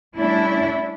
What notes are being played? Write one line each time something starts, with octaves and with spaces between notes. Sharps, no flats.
G3 A3 C#4 D4 E4